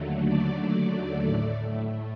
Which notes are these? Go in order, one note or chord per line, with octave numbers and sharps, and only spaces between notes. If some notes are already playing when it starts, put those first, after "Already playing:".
Already playing: D#2 D3 F#3 A3
D5
A2 A3